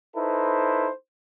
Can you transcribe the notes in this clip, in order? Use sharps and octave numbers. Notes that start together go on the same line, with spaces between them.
D#4 E4 A4 B4 C5